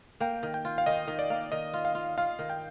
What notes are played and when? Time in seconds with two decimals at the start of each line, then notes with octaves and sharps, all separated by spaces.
0.20 A#3 G5
0.43 D#3
0.54 G5
0.65 F4
0.78 F5
0.86 D#3 D#5
1.08 D#3
1.19 D5
1.30 A#3
1.52 D#3 D#5
1.73 F4
1.85 F5
1.95 F4
2.18 F4 F5
2.39 D#3
2.50 G5